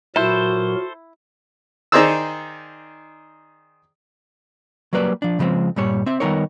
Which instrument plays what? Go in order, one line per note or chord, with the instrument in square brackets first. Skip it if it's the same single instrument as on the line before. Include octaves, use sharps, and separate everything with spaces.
[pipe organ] A#2 F#3 A#4 [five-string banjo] E4 [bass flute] F#4 [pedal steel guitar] A4 C5
[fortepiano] D#3 D#4 G#4 C5 D5 E6
[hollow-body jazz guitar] F#3 G3 A#3 B4 D5
F3 D4
C#3 F3 G#3 C4
G2 A#2 G3 C#5
C4 E5
D#3 G3 B3 D#4 A#4 C#5